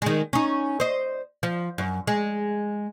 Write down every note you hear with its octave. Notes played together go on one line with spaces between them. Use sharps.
D#3 G#3
C#4 D#4
C5 D#5
F3
F#2
G#3